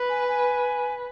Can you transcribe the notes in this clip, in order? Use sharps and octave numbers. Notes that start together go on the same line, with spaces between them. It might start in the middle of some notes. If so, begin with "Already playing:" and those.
Already playing: B4
G#5
G#5